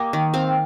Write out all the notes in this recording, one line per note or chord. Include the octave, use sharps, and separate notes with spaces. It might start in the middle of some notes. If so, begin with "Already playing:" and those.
Already playing: A#3 G4 D#5
D#3
C4 F5